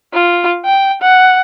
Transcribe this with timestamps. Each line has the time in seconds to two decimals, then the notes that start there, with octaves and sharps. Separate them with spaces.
0.13 F4
0.65 G5
1.02 F#5